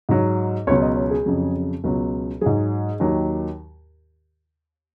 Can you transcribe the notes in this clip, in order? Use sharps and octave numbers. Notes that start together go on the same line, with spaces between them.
G#2 F#3
C#2 B2 F#3 C#5
D#5
C#5
G#4
F2 C#3 F#3
C#2 B2 F#3
G#2 F#3 G#4
D#2 D#3 F#3